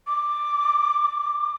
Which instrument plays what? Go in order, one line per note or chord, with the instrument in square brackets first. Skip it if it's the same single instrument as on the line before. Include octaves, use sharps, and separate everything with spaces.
[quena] D6